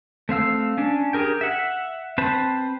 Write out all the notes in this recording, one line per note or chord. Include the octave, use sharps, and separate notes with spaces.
A3 C4 F5 E6
C#4 D4
G4 G#4 A#4 G5
E5 F#5
C4 B4 C5 A5 B5